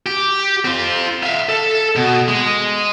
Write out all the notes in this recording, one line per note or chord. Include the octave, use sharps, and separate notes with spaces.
G4
C4 F4
E5 F5
A4
B2
G#3